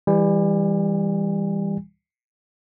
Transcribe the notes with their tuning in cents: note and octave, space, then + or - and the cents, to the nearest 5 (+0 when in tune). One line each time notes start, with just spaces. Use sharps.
E3 +0 G3 +25 G#5 -30